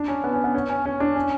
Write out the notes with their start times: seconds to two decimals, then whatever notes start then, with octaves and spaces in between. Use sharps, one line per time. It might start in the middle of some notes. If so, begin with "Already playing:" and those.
Already playing: D4
0.08 C#4
0.24 B3
0.33 C#4
0.44 B3
0.55 C#4
0.69 C#4
0.85 C#4
1.00 D4
1.16 C#4